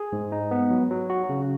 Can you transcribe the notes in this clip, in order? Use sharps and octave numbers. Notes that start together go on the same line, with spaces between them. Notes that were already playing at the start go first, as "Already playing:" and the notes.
Already playing: G#4
G#2
D#4
B3
F#3
F#3
F#4
C#3